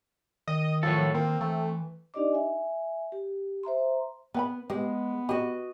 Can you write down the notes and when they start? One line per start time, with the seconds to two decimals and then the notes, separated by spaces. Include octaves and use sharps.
0.47 D#3 D#5
0.83 A2 F3 F#3 A4
1.14 D#3 A#3 C4
1.41 E3 A3
2.14 D4 D#4 G4 D5 D#5 D6
2.32 E5 G#5
3.12 G4
3.63 C5 E5 A#5 C6
4.34 B3 B4 G5 B5
4.70 G#3 B3 G4
5.29 F#4 G4 D#5